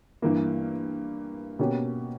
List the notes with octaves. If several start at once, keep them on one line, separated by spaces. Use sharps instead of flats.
G2 E3 A#3
B2 A#3 C#4 G4